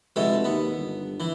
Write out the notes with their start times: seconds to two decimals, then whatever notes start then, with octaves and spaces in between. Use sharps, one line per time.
0.16 F1 B2 G#3 A3
0.44 D#2 B3
0.78 G1
1.20 E3